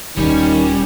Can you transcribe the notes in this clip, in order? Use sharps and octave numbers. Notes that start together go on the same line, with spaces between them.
D#1 D#3 G3 C#4 D#4